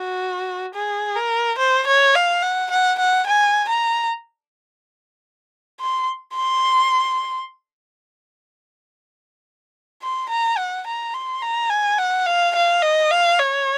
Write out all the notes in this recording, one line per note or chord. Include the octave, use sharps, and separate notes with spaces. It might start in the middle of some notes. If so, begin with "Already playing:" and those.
Already playing: F#4
G#4
A#4
C5
C#5
F5
F#5
F#5
F#5
G#5
A#5
C6
C6
C6
A#5
F#5
A#5
C6
A#5
G#5
F#5
F5
F5
D#5
F5
C#5